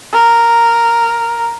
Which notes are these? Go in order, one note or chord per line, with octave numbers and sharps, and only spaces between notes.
A#4